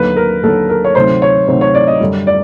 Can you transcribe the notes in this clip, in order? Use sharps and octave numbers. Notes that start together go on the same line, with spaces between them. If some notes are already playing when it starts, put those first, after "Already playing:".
Already playing: D#2 D3 F#3 B4
A#4
D#2 D3 F#3 A4
A#4
C#5
D2 C3 D#3 F#3 C5
C#5
D2 C3 D#3 F#3 C5
C#5
D5
D#5
F#2 D3 G3
D5